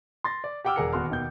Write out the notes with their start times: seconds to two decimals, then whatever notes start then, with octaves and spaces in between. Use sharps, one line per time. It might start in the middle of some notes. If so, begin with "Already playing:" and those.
0.24 C6 A6 A#6
0.44 D5
0.64 G4 F#5 G5 D6 E6 F6
0.76 E1 G#4 A#4 F#5 C#7
0.93 D#1 B3 F#4 C6 F6
1.10 D#2 B2 G6